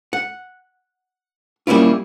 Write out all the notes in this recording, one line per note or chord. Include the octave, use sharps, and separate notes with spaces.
F#5
G3 A#3 C#4 E4 F4